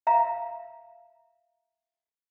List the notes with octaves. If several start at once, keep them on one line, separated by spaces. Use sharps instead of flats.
E5 F5 A#5